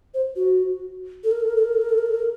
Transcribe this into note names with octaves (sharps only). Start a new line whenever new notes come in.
C5
F#4
A4
A#4
A4
A#4
A4
A#4
A4
A#4
A4
A#4
A4
A#4